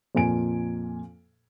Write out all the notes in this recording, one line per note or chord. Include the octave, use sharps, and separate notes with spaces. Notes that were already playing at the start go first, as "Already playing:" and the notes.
F2 A#2 G#5 D7